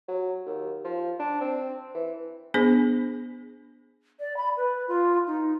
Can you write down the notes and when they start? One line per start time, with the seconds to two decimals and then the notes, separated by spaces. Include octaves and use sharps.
0.08 F#3
0.46 D#2
0.84 F3
1.20 D4
1.41 C4
1.94 E3
2.54 B3 D4 G#4 C5
4.20 D5
4.37 B5
4.57 B4
4.88 F4
5.27 D#4